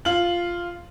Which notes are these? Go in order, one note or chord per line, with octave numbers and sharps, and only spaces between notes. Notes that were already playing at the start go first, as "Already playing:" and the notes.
F4 F#7